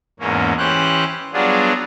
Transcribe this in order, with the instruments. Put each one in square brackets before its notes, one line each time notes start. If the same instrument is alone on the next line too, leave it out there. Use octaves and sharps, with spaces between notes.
[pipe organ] E2 G#2 A#3 C#4
E3 C#4 G4 C5 F#6
F#3 G3 B3 D4 F4 G#4